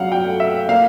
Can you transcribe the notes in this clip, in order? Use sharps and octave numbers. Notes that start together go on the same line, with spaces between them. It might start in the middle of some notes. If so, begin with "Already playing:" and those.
Already playing: F#3 C#4 F5 F#5
G5
A3
E5
A#3 F5